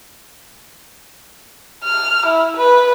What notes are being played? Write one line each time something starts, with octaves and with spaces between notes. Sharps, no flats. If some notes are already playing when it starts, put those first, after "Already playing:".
F6
E4
B4